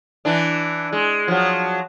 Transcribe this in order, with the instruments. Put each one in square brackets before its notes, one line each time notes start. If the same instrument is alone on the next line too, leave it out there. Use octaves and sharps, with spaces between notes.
[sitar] E3 D4
G#3
F3 F#3